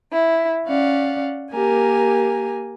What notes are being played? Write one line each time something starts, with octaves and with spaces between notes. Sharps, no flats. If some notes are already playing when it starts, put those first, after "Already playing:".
E4
C#4 D5 F5 F#5
A#3 G4 A#4 G#5